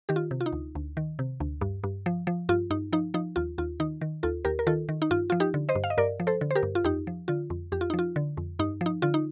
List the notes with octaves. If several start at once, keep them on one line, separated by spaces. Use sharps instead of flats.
D#3 G4
F4
C3
F4
D#4
D2
D2
D#3
C3
D2
G2
G2
F3
F3
G2 F4
G2 D#4
F3 D#4
F3 D#4
D#2 F4
D#2 F4
D#3 D#4
D#3
D#2 F4 A4
D#2 G4 A#4
A#4
D#3 F4 A4
D#3
D#4
G2 F4
F3 F4
D#4 G4
D3
C5 D#5
G2
F5
D#5
G2 A#4 D5
F3
A4 C5
D3
C5
G4 A#4
G2
F4
F2 D#4 G4
F3
D3 F4
F2
F2 G4
F4
F3 D#4
F4
D3
F2
G2 D#4
F3
D#4
D3 F4
D#4